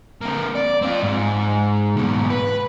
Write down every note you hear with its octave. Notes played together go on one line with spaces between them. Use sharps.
A#3 C4
D5
C4 F4
G#2
G#2 B2
B4